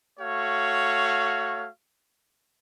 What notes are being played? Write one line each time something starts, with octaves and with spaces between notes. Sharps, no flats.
A3 F#4 C#5 F5